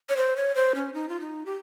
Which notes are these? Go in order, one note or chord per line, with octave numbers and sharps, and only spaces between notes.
C#5
C5
C#5
C5
C#4
D#4
F4
D#4
G4